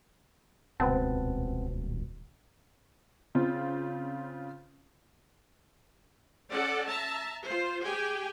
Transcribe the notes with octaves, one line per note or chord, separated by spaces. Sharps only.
D#1 C#2 B2 C4 B4 F#5 A5
C#3 C4 F4
C#4 A4 D5 F#5
E5 A5 A#5
F4 C5
G4 G#4 G5 G#5